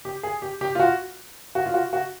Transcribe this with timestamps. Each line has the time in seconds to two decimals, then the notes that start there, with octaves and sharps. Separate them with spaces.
0.05 G4
0.23 G#4
0.42 G4
0.61 G4
0.75 F4
0.80 F#4
1.55 F#4
1.66 F4
1.74 F#4
1.93 F#4